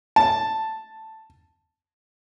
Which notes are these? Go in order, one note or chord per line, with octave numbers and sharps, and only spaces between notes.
A5